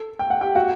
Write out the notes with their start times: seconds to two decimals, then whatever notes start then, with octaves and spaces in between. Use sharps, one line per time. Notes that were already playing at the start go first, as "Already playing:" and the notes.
Already playing: A4
0.19 G5
0.30 F#5
0.41 G4 G5
0.55 F#4 F#5